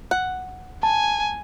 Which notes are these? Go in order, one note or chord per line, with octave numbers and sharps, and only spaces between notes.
F#5
G#5 A5